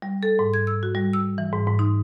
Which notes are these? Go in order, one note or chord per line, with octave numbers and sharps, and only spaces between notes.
G3
A4
G#2
G#6
E6
F#4
G3
E6
E3
G#2
G#2
D#4